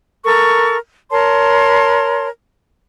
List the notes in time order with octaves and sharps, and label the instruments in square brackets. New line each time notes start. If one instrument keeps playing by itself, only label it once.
[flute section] A4 A#4 C#6
A#4 C#5 A5 C6